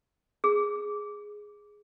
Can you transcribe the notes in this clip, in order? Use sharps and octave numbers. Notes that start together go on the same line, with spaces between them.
G#4